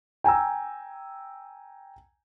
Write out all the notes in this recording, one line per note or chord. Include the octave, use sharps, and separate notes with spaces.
G5 G#5 A#5 E6